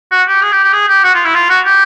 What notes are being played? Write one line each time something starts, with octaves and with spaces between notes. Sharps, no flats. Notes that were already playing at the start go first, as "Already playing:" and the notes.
F#4
G4
G#4
G4
G4
G#4
G4
F#4
F4
E4
F4
F#4
G4